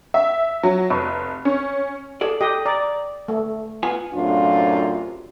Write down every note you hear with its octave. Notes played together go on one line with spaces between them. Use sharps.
E5
F#3
F1
C#4
G#4 A4 D5
G4 D#5
D5 A#5
A3
B3 F4 G#5
F#2 A2 C3 D4 F4